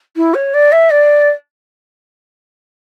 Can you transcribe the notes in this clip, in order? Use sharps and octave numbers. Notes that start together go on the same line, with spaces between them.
E4
C#5
D5
E5
D5